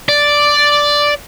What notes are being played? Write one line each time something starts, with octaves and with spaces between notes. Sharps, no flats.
D5